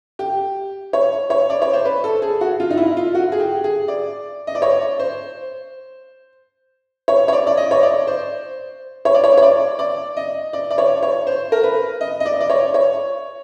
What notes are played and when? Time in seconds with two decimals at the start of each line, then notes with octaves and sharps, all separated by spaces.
0.19 G4
0.93 C#5
1.30 C#5
1.50 D5
1.62 C#5
1.73 C5
1.85 B4
2.04 A4
2.22 G#4
2.41 F#4
2.60 F4
2.70 D#4
2.77 E4
2.97 F4
3.15 F#4
3.32 G#4
3.40 G4
3.64 G#4
3.88 D5
4.47 D#5
4.55 D5
4.62 C#5
4.99 C5
7.08 C#5
7.28 C#5
7.33 D5
7.47 D5
7.57 D#5
7.71 C#5
7.83 D5
8.07 C5
9.05 C#5
9.14 D5
9.24 C#5
9.37 C#5
9.42 D5
9.79 D5
10.17 D#5
10.53 D5
10.71 D5
10.78 C#5
11.03 C#5
11.27 C5
11.52 A#4
11.63 B4
12.01 D#5
12.20 D#5
12.26 D5
12.41 D5
12.50 C#5
12.74 C#5